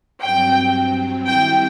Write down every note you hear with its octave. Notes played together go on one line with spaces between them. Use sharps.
G2 F#3 C4 G5
D#3 G3 C4 E4 G5